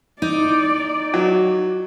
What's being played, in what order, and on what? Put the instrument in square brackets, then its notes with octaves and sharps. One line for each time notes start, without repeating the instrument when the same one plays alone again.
[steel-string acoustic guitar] D#4 [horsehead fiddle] D5
[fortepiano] F#3